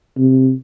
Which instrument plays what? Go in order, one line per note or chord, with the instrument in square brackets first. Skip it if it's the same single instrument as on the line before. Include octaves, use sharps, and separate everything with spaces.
[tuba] C3